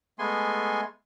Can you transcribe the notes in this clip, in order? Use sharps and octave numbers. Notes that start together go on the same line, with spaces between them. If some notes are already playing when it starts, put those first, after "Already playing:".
G#3 A3 B3 G#5 C6